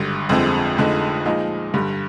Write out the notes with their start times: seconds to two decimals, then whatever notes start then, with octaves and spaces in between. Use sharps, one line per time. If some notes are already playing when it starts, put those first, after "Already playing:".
Already playing: G#1 G2 D3
0.29 G1 F2 D3 G#3 C4
0.77 F1 F2 D3 G#3 D#4
1.26 A#2 F3 G#3 D#4
1.74 G2 D3 G3